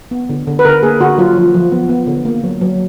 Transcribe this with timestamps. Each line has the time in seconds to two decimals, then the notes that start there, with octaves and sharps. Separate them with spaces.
0.11 B3
0.30 D3
0.47 D3
0.59 B4
0.65 D3 A#4
0.82 A#3 G#4
1.00 D3 F#4
1.18 F#3 F4
1.37 F3
1.54 F3
1.72 B3
1.89 B3
2.07 D3
2.25 A#3
2.44 F#3
2.61 F#3